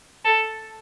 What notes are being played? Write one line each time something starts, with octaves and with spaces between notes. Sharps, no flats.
A4